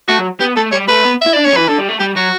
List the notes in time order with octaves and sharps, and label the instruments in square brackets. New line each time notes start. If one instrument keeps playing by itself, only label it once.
[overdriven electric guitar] A3 [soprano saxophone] F#4
[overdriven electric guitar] F#3
[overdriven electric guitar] B3 [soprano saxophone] G4
[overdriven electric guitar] A3 [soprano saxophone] A4
[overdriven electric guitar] G3 [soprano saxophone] C#5
[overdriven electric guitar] A3 [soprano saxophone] B4
[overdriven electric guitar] B3
[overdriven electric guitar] E4 [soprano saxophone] E5
[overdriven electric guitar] D4 [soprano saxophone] D5
[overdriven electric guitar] C#4 [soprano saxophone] C#5
[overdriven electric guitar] F#3
[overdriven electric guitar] E3 [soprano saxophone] B4
[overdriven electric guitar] D3 [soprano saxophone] A4
[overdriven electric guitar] G3
A3
[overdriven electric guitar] G3 [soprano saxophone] G4
[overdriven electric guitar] F#3 [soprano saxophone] F#4